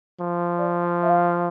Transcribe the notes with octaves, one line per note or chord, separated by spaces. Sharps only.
F3
D5
F5
E5
F5